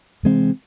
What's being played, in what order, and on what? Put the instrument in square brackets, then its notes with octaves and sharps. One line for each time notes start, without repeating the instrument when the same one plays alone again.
[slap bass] C3 E3 G#3 C4